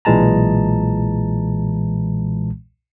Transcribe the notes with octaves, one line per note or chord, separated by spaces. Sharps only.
B1 A#2 E3 G#3 A5 A#5